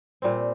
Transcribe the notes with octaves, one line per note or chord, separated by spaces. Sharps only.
A#2 G3 C4